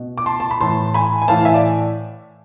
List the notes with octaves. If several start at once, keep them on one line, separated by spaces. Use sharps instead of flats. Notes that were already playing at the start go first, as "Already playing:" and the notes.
Already playing: B2
D6
A5 C6
A5
B5
A2 E3 A5 C6
G#5 B5
G#5
A2 E3 F5 A5
F5
E5 G#5
D5